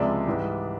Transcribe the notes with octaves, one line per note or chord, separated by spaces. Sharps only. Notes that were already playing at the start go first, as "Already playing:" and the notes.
Already playing: C#2 C3 F3 G#3 D5 E5
G#2 E3 G3